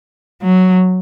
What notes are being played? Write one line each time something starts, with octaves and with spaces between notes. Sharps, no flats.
F#3